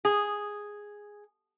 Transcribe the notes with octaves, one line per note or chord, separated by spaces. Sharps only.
G#4